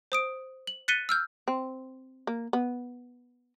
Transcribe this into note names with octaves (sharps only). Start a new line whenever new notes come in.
C5 D#6 D7
F#7
F#6 A6 B6 C#7 D#7 G7
E6 F6 G6
C4
A#3
B3